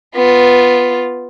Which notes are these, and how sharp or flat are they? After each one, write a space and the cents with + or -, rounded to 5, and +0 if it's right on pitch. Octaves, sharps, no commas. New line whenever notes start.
B3 +0 F4 +0